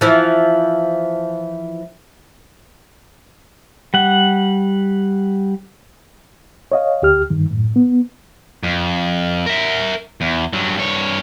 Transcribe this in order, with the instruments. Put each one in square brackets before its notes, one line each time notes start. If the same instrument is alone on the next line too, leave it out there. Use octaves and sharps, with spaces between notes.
[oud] E3 F3
[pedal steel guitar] G3 F#5
[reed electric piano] C#5 D#5 F5
D2 G4 F6
G2 D#3
F#2 A2
B3
[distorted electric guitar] F2
A#4 E5
E2
G2 F#3
G2 C#5